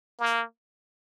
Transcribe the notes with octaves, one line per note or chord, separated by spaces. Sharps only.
A#3